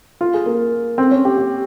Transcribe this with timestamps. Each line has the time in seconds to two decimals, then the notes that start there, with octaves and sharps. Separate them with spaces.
0.21 F4
0.34 G#4
0.46 A#3
0.98 C4
1.11 C#4
1.25 G4
1.38 G4